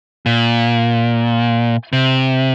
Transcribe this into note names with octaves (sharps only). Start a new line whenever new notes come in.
A#2
C3